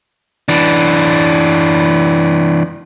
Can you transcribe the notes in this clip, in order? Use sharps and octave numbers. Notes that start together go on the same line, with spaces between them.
E3 D4